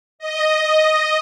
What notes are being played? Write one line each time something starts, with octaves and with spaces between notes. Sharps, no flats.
D#5